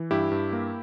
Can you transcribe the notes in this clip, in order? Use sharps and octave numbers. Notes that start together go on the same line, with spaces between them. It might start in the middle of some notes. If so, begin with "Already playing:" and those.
Already playing: E3
G2 E4 G4
G2
A#3